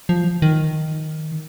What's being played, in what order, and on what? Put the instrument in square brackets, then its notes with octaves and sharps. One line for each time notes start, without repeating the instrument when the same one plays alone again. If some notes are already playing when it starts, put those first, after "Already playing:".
[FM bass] F3
D#3